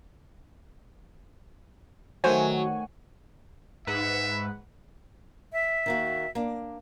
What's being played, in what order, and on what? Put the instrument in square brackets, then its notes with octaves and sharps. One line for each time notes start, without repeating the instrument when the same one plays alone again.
[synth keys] D#3 A3 G#5 [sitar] F#3 [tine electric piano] F#4 [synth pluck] C5
[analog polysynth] G#2 B4 F#5 [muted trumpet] E5
[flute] E5
[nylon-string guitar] D#3 A#3 F#4
A#3 D4